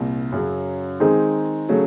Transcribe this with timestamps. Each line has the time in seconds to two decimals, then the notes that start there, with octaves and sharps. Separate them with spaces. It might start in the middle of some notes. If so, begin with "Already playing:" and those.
Already playing: C2 A#2 G3
0.32 F#2 C#3 F#3
1.00 D#3 G#3 C4 D#4 G#4
1.69 C#3 F#3 A3